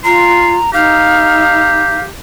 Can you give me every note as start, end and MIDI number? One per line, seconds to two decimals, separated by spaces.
0.04 0.58 65
0.04 0.71 82
0.04 0.50 84
0.73 1.97 63
0.73 2.10 67
0.73 2.03 77